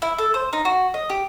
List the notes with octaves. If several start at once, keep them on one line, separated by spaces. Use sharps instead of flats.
E4
A4
C5
D#4
F#4
D#5
G4